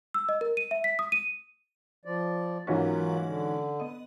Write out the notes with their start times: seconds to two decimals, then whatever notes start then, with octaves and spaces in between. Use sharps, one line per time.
0.14 E6
0.29 D#5
0.41 A#4
0.57 D#7
0.71 E5
0.84 B6
0.99 D#6
1.12 D#7
2.05 F3 D5
2.67 G#2 E3 F#3 A#3 C#4 F4 F#4 B4
3.25 D3
3.80 B3 D#5